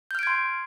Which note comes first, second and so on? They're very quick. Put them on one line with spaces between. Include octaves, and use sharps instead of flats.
G6 F6 D7 G#6 C6